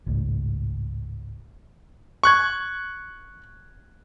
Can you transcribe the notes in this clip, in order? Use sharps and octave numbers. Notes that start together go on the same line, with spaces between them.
G#1 C#2 A2
C#6 F#6 G#6